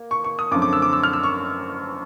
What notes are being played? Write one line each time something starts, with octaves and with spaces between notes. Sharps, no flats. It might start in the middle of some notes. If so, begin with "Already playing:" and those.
Already playing: A#3
C#6
C#6
D#6
F#2 D3 F3 A3 C4 D6
D6
E6
D6
E6
F6
E6
C#6